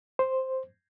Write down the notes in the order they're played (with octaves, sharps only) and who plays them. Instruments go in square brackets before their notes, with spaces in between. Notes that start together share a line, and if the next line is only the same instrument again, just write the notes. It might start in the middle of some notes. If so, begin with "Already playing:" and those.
[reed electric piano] C5